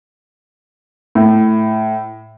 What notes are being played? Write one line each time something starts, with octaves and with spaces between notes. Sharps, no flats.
A2